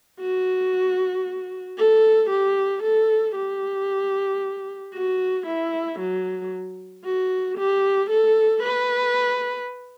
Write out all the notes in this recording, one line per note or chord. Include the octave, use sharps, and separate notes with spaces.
F#4
A4
G4
A4
G4
F#4
E4
F#3
F#4
G4
A4
B4